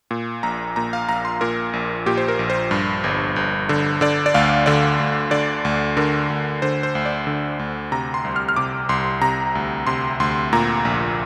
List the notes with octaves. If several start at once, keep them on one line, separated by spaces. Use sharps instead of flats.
A#2
A#1 A#5
A#2 A#5
F5
A#1 A#5
C6
A#2 A#4
A#1
A#2 G4
C5
A#4
A#1
C5
G2
G1
G1
D3
D3 D5
D5
D2 F5
D3 D5
D2
D3 D5
D2
D3 A#4
D2
D3 C5
C5
D2
D5
D3
D2
C3 A#5
C6
C2
F6
F6
C3 D6
C2 C6
C3 A#5
D2
C3 C6
D2 C6
A#2 A#5
A#1